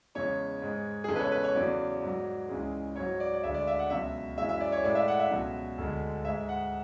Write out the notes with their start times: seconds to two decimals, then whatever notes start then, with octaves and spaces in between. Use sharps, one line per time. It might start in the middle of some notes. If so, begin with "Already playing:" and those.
0.15 E2 C#3 G#3 C#5
0.62 G#2 G#3
1.04 G#4
1.08 E2 C#3 G#3 A4
1.15 B4
1.20 C#5
1.32 B4
1.44 C#5
1.55 E2 C#3 F#3 D5
2.02 G#2 F#3
2.49 C#2 C#3 E3 G#3
2.96 G#2 F#3 C#5
3.20 D5
3.34 D5
3.43 D2 D3 G#3 E5
3.54 D5
3.67 E5
3.79 F#5
3.90 C#2 B2 F#3 E5
4.38 F#2 E3 G#3 E5
4.49 E5
4.60 D5
4.72 C#5
4.84 A2 G#3 D5
4.95 E5
5.08 F#5
5.19 E5
5.30 C#2 B2 F#3
5.78 D2 D3 G#3
6.25 G#2 G#3 E5
6.49 F#5